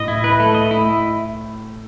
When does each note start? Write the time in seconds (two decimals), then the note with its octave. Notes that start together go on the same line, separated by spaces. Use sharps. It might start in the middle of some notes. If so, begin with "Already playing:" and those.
Already playing: A2 D#5
0.08 E4
0.24 B4
0.40 A3
0.55 D#5
0.71 E4